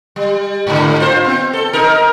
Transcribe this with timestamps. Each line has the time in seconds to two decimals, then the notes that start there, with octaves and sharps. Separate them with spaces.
0.16 G3
0.67 G#2 D3
1.00 F4 C5
1.24 B3 C4
1.53 A4
1.73 D#4 A#4